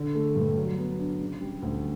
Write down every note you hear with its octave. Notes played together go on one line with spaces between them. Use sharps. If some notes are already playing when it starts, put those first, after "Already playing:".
Already playing: D3
A3
G2
F#3
B3
D4
C#3
G3
D2